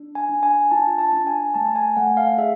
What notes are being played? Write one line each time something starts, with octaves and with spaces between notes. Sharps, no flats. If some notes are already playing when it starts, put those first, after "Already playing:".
Already playing: D4
G#5
D4
G#5
F4 A5
A5
D4
G#5
A3 A5
G#5
A3 F#5
F5
G#4 E5